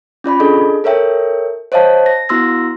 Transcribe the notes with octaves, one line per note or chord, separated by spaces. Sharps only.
C#4 F4 D5 B5
D4 G#4 A4 D5 D#5
A4 A#4 C#5 E5 G5
C5 C#5 D#5 F5 A5
A#6
B3 E4 F#4 C6 E6 A#6